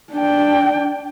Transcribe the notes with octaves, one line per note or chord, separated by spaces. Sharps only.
D4 G5